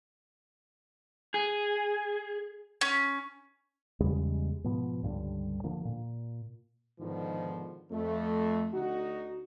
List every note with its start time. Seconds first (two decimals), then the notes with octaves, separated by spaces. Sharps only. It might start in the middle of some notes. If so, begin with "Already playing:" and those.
1.34 G#4
2.81 C#4
4.00 E2 C#3 G3 G#3
4.64 G#2 B2 F3 B3
5.03 C#2 G2 D3 G3
5.64 D3 F3 A#3
5.85 A#2
7.00 G#2 B2 D3 D#3 F3
7.91 F2 A3
8.74 D2 D#4 F#4